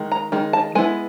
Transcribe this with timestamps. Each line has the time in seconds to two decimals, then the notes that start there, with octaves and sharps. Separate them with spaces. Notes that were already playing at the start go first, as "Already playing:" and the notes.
Already playing: D#3 G#3
0.12 A#5
0.32 D#3 G#3
0.53 A5
0.75 G#3 B3 E4 G#5